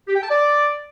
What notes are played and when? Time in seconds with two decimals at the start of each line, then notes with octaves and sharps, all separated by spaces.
0.08 G4
0.15 G5
0.23 A5
0.30 D5